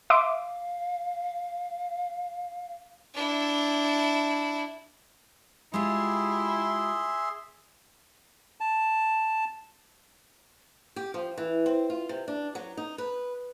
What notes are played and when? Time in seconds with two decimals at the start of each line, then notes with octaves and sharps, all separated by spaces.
0.10 E5 F5 C6 D6
3.14 D4 E4
5.74 G#3 E4 F4 G4 G#4 E5 C6
8.60 A5
10.96 G4
11.14 F3
11.38 E3
11.66 C4
11.90 F4
12.09 C3
12.28 D4
12.55 F#3
12.77 D#4
12.98 B4